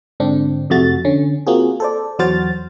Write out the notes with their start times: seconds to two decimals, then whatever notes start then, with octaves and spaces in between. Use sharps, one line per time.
0.20 G#2 D3 C4 D4
0.70 F2 C3 A3 F#4 A6
1.05 D3 C#4
1.46 A#3 C4 F4 F#4 G#4
1.80 A4 C5 D5
2.19 E2 F#3 F#4 C5 F6 A6